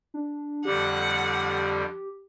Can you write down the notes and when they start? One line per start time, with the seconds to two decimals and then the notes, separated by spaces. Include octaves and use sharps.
0.14 D4
0.65 F2 D3 G3 G4 F#5